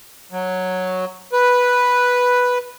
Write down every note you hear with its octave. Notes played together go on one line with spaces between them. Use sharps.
F#3
B4